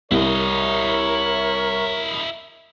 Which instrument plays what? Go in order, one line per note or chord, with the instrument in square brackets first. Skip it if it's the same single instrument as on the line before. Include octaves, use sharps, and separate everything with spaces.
[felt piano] C2 [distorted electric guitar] E4 D#5 [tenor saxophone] A#4 [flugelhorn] C#5